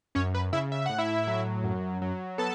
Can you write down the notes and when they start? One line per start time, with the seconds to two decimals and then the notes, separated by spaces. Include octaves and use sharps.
0.15 F#2 C#4 C#5
0.35 B4
0.53 C#3 E4 E5
0.72 E5
0.86 A2 F#5
0.98 E4 E5
1.27 F#3
1.64 F#2
2.02 F#3
2.38 B3 A4 A5